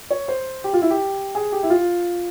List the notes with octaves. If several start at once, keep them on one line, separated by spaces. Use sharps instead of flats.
C#5
C5
G4
F4
E4
G4
G#4
G4
E4
F4